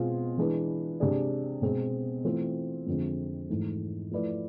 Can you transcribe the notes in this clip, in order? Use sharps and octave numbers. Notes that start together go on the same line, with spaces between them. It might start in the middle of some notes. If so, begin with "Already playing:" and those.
Already playing: B2 G#3 C4 F4 G#4
E3 G#3 D4 G#4 B4
C3 G#3 D4 G#4 D5
B2 G#3 C4 G#4
E3 A3 C4 F4
F2 D3 G#3 C4
G#2 E3 A3
F3 A3 E4 B4 D5